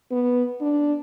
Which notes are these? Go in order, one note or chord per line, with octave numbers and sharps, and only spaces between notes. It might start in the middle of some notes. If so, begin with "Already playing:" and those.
B3
D4